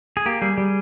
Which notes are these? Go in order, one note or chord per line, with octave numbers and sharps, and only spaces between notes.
G#4
A#3 G4
G3 G#4
G3